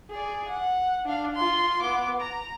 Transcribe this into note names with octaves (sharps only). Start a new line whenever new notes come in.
G#4 D5
F#5
D4 F5
F4 C6
B3 D6
A#5